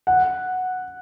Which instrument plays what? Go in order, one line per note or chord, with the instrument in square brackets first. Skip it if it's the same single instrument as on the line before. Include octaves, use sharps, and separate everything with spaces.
[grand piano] F#5